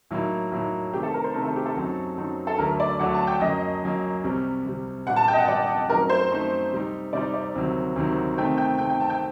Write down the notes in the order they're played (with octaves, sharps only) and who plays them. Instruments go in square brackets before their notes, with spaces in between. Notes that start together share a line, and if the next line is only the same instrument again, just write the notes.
[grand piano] A2 F#3 A#3 D#4
A2 F#3 A#3 D#4
[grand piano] C3 D#3 A3 D4 [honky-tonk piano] G4
[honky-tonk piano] A4
A#4
C5
[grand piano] C3 D#3 A3 D4 [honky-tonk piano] A#4
[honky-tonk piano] A4
G4
A4
[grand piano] F#2 F#3 C4 D#4
F#2 F#3 C4 D#4
[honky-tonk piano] A4
[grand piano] D2 D3 F#3 A3 D4 [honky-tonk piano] A#4
[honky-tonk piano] D5
[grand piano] D2 D3 F#3 A3 D4 [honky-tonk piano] F#5
[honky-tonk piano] A5
G5
[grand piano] F#2 F#3 A#3 [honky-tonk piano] D#5
[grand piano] F#2 F#3 A#3
C2 C3 G3
C2 C3 G3
[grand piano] A#2 G3 D4 [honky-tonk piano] F#5
[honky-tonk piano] A5
G5
D#5
F#5
[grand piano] A#2 G3 D4 [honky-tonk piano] D5
[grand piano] F#2 F#3 A3 C4 D#4 [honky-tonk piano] A#4
[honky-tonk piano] C5
[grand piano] F#2 F#3 A3 C4 D#4
C3 G3 C4 D#4
[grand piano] C3 G3 C4 D#4 [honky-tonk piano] D5
[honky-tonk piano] D5
[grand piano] D2 C3 D#3 F#3
D2 C3 D#3 F#3
[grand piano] C3 D#3 A3 C4 [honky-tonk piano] G5
[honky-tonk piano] G5
[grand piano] C3 D#3 A3 C4 [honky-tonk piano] G5
[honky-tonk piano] G5
A5
G5